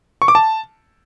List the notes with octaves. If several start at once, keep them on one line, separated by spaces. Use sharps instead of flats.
C#6
D6
A5